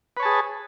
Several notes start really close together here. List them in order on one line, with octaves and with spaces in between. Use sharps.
B4 C#5 A5 G#4